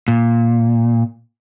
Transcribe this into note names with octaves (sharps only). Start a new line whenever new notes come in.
A#2